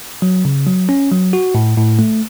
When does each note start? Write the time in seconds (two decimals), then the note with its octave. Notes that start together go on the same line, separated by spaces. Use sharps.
0.22 F#3
0.45 C#3
0.66 F#3
0.89 C#4
1.11 F#3
1.33 F#4
1.55 A2
1.77 A2
1.99 A3